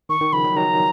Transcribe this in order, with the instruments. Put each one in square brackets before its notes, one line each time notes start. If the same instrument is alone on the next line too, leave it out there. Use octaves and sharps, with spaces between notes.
[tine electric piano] D#3 [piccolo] C#6
[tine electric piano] D#3
[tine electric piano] C#3 F3 [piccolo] B5
[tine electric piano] D#3 F#3
[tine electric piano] D#3 F#3 [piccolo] A#5